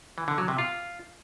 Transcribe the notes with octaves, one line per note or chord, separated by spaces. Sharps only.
E3
D3
F#3
C3
F4